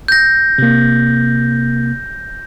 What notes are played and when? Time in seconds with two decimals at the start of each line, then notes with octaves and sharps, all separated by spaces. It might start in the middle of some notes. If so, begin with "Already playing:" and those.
0.08 G6 A#6
0.58 C3 A#3